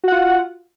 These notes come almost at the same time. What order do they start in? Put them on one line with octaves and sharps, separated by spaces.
F#4 F#5 F4